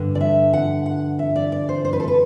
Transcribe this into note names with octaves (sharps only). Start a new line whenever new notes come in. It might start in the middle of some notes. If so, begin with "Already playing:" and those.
Already playing: G2 D3
D5
E5
F#5
F#5
E5
D5
D5
C5
C5
B4
A4
B4